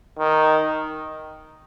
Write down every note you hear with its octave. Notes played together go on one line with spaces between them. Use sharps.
D#3